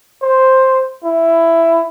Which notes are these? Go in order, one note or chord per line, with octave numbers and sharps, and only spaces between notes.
C5
E4